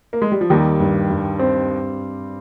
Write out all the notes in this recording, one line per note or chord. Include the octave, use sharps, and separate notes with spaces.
A#3
G#3
G3
F3
D#2 D#3 G3
G2
G2
C4